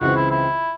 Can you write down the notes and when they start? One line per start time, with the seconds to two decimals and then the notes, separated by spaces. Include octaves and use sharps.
0.01 C#2 C#3 E3 C4 F#4
0.16 E4
0.31 E4